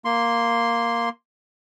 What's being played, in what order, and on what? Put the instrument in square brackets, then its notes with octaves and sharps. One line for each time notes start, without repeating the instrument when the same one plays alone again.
[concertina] A#3 C6